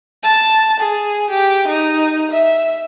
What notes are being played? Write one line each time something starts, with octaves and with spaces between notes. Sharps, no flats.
A5
G#4
G4
D#4
E5